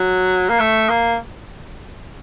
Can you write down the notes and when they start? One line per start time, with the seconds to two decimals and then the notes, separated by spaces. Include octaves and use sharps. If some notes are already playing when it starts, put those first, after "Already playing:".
Already playing: F#3
0.49 A#3
0.60 A3
0.89 A#3